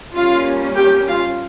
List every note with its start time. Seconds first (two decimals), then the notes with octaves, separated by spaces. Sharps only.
0.15 G3 A#3 C#4 F4 F5
0.76 G4 G5
1.07 F4 F5